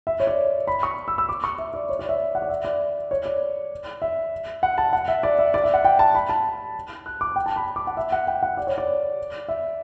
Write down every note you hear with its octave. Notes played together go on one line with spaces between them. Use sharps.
E5
C#5
D5
B5
C#6
E6
E6
D6
C#6
E5
D5
C#5
D5
E5
F#5
D5
E5
D5
C#5
D5
E5
F#5
A5
F#5
E5
D5
E5
D5
E5
F#5
G5
A5
B5
A5
F#6
D6
G5
A5
B5
D6
F#5
E5
F#5
G5
F#5
D5
C#5
D5
E5